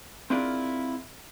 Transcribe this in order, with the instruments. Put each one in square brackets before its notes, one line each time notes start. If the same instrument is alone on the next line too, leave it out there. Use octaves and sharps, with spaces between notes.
[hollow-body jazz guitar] C4 D4 E4 F4 G#4 A#4